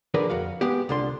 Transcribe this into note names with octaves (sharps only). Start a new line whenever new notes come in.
D3 F3 G#4 A#4 B4 D5
F2 F#4 F5
G#3 B3 G4
C2 D3 F4 C6